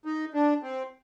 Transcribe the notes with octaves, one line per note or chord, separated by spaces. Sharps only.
D#4
D4
C4